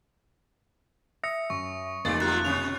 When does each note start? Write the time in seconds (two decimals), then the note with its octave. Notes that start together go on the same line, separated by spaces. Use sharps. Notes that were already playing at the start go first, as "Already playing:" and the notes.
1.24 E5 D#6 A#6 C#7
1.50 F#2 C#6
2.05 F1 E2 G3 A#3 D#4 D5 A6
2.22 F3 G3 F4 F#6
2.45 B2 D3 C#4 F7